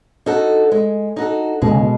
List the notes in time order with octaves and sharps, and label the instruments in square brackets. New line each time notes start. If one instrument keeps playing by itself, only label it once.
[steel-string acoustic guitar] D#4 F#4 A4
G#3
D#4 F#4 A4
[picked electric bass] B2 [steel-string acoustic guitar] G#3
[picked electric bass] C#3
B2